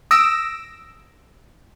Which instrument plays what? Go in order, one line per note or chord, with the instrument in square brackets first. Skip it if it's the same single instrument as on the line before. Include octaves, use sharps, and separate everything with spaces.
[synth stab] D#6 E6 A#6 D7 E7